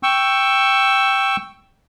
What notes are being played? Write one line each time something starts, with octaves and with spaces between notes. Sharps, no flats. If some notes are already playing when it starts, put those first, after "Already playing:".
G5 C#6 E6